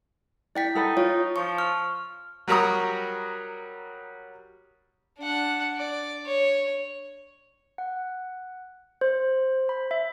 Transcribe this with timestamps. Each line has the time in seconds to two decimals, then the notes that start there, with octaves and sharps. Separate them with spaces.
0.55 E4 D5 G5 B6
0.75 D#4 A4 F#5 B5
0.97 F4 C#5
1.36 F3 C#6
1.58 F6
2.48 F#3 G3 A#4 A#5 C#6 D#6
5.19 D4 F#5
5.78 D5
6.26 C#5
7.78 F#5
9.01 C5
9.69 B5
9.91 E5